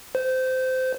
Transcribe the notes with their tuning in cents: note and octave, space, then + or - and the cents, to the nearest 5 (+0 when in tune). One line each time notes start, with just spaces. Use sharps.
C5 -20